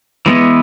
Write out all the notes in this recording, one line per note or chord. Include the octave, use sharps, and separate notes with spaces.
E3 G#3 B3